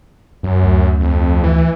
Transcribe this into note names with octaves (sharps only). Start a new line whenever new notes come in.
F#2 F#3
D2
F2
E3